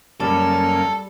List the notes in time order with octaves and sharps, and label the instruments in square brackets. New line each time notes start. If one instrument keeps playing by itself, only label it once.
[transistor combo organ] F#2 A#3 C#4 [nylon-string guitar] G3 [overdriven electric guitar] A4